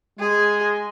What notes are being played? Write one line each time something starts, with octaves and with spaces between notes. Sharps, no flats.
G#3 G#4